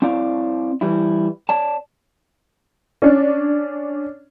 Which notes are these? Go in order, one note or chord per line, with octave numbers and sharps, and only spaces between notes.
C4 E4 C#5 D5 F5
E3 G3 E4
C#5 D5 A5
C#4 D4